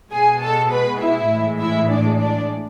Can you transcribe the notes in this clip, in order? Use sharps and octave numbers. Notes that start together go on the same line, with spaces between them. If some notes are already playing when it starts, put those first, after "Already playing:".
B2 G#3 G#4 G#5
A4 A5
B4 B5
E4 E5
A2 E3 G#3
E4 E5
D4 D5
D4 D5